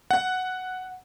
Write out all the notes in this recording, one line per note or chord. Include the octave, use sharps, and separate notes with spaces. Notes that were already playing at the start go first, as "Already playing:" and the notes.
F#5